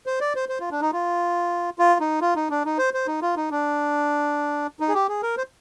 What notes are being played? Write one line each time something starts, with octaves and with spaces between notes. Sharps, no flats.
C5
D5
C5
C5
F4
D4
D#4
F4
F4
D#4
F4
D#4
D4
D#4
C5
C5
D#4
F4
D#4
D4
D#4
G#4
G4
G#4
A#4
C5